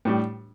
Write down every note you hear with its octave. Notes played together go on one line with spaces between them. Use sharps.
A2 G3 D4 G4